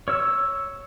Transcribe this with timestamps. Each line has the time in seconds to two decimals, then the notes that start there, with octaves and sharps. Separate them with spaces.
0.08 C#5 E6